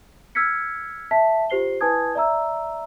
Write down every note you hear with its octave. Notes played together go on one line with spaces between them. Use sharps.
E6 F6 G#6 B6 C#7
E5 A5 B6
F4 G4 C5 C7 G7
E4 B4 G#5 A5 D#6 G#6
D5 E5 A#5 E6